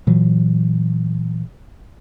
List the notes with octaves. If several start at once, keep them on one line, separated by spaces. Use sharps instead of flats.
A#2 E3 F#3